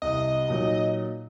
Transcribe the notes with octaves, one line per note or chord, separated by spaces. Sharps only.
C2 C3 D#5
A#2 F#3 D#4